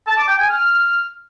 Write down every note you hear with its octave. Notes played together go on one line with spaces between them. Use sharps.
A5
D6
G5
G#5
F6